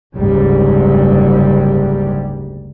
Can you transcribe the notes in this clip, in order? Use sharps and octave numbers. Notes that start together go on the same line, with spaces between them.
F#1 D2 G#2 G3